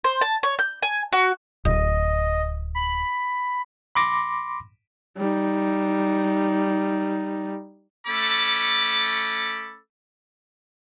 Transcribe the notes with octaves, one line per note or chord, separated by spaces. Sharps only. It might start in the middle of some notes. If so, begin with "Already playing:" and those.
C5
A5
C#5
G6
G#5
F#4
D1 D#5
B5
B5 C6 D6 A#6
G3 D#4
A3 C#4 A4 B5 D6